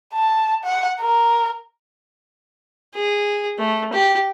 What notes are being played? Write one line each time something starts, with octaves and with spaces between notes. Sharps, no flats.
A5
F#5
A#4
G#4
A3
G4